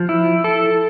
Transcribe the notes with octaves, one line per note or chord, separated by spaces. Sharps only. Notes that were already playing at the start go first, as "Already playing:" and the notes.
Already playing: F3
E4
A4